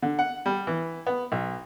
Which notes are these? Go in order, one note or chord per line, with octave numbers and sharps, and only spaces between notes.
D3
F#5
G3
E3
B3
B1